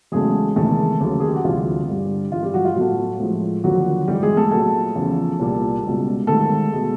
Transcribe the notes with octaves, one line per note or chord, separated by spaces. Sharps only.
E2 C#3 F#3 G#3 A3 G#4
E2 C3 D#3 G#3 A3 A4
D#2 C#3 F#3 A3
G#4
G4
F#4
D2 C3 E3 G3 F4
G2 D3 G3
G2 E3 G#3 F4
G3 G4
F#3 F#4
F4
A2 F#3 A3 F#4
A2 F3 G#3
D#2 D3 F3 F#3 F#4
G#2 E3 G3 G#3 G4
G#3 G#4
A3 A4
A#2 F#3 A3 A4
E2 C#3 F3
C2 A#2 G3
C#2 B2 G3
G#2 D#3 G3 A3 A4
B2 G#3